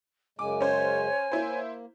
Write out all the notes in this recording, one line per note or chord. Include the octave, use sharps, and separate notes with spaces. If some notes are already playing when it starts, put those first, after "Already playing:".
F#2 C#3 G#3 G#5 D6
C#4 C5 C#5
A#3 E4 C5